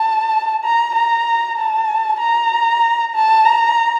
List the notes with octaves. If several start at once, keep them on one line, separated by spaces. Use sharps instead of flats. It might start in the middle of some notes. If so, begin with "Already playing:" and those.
Already playing: A5
A#5
A#5
A5
A#5
A5
A#5